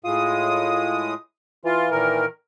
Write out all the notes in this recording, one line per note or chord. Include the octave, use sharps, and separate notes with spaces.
A2 G#3 F4 D#6
E3 F4
A#2 D#3 A#4